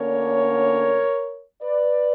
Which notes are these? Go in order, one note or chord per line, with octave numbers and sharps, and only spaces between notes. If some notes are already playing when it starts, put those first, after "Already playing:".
Already playing: D2 D3 A#3 C#4 A#4 C#5
B4 D5